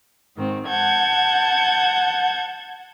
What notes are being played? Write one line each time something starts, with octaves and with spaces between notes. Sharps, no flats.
G#2 D#3 C4
F#5 A5 G6 G#6